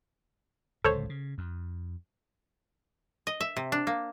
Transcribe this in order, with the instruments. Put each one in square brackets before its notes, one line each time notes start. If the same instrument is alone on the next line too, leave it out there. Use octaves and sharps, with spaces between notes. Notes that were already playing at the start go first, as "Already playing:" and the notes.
[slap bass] D1 C#2 A2 [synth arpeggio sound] A4 C5 C#5
[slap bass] C#3
F2
[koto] D#5
E5
C3
D4
A#3